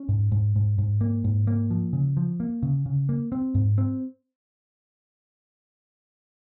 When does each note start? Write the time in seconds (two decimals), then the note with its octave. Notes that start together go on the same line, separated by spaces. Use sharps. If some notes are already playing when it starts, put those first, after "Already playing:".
Already playing: C#4
0.09 G#2
0.32 G#2
0.56 G#2
0.78 G#2
1.01 A#3
1.24 G#2
1.47 A#3
1.70 F3
1.93 C#3
2.17 F3
2.40 A#3
2.63 C#3
2.86 C#3
3.09 A#3
3.32 C4
3.55 G#2
3.78 C4